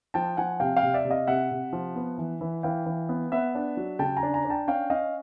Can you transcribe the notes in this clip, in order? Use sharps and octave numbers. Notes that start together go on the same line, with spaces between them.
F3 G5 A5
F3 F#5 G#5
C3 F5 G5
F5 G5
C3
D5 E5
C3
D#5 F5
C3 E5 F#5
C3
F3
B3
E3
E3
E3 F5 G5
E3
B3
B3 E5 F#5
D4
F#3
C#3 G5 A5
G#5 A#5
D4
G#5 A#5
D4
G5 A5
C#4 F5 G5
C#4 D#5 F5